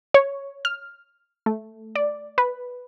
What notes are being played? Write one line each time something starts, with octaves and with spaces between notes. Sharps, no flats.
C#5
F6
A3
D5
B4